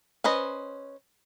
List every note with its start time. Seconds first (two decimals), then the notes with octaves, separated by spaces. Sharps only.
0.24 C#4 B4 C5 D#5